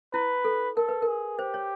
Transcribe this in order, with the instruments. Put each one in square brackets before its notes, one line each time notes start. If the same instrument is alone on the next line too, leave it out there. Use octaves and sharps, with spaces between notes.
[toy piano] E4 [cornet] B4
[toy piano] A4
[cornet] A4 [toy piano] A#4
[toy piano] B4
A#4
[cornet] G#4
[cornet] G4 [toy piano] C5
[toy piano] C#5